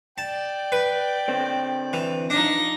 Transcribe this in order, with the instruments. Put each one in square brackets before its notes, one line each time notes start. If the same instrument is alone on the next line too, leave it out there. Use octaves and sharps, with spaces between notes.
[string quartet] D5 [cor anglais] G5 [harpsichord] A5
[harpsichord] B4
[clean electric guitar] D3 C4
[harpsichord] E3
[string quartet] F3 D#4 A#6 [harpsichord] D4